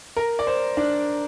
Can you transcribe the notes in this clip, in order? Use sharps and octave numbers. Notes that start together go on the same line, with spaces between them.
A#4
D5
C5
D4